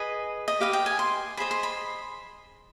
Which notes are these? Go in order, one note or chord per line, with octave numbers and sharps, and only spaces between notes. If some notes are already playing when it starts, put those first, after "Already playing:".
Already playing: G#4 B4 D#5
D#5
G4 B4 D#5 F5
G5
G#5
C6
G#4 C5 D#5 B5
C6
B5